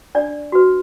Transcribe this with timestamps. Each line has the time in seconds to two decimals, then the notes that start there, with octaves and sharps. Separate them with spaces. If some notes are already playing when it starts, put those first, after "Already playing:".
0.15 D4 D5
0.52 F#4 B4